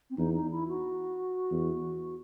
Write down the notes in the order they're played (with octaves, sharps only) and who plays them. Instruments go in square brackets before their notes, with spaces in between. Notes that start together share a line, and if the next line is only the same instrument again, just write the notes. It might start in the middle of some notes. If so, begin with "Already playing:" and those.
[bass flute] C4
[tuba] E2 [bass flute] D#4
[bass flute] D#4
E4
F#4
[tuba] E2